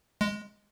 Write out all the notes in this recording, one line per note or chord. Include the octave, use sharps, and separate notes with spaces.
G#3